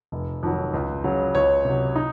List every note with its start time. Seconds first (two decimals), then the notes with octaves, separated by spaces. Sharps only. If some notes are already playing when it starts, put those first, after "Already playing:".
0.12 F1
0.43 F2 D#3 F#3
0.74 C#2
1.04 C#3 F#3
1.34 C#2 C#5
1.65 C3 F#3
1.96 D#4